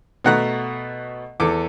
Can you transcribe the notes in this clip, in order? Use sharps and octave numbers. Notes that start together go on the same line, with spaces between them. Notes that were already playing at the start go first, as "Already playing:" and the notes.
B2 A3 F#5 A#5 F#6
E2 A4 D6